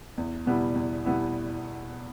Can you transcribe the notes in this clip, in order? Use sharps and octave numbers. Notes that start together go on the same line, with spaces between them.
E2
B2 G3 B3 E4
E2
B2 G3 B3 E4